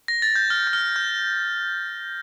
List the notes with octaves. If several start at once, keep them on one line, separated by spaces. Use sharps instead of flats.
A#6
A6
G6
F6
G6
F6
G6